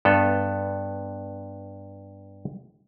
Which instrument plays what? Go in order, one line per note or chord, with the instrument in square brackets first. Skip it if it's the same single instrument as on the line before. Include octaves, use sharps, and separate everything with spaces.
[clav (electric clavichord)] G2 B3 A4